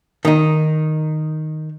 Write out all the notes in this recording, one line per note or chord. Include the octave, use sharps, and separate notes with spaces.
D#3 D#4